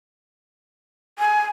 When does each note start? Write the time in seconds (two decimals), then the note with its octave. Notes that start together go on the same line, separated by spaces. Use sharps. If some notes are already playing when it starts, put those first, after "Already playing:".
1.19 G#5